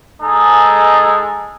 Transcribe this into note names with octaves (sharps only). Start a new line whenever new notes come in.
G#3 D#4 G#4 A4